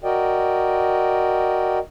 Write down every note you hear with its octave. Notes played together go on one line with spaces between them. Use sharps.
F#4 A#4 D5 D#5 G5